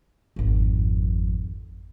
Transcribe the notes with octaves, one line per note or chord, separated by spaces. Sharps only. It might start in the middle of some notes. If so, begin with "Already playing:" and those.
G#1 F2